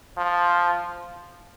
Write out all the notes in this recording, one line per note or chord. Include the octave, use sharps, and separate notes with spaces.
F3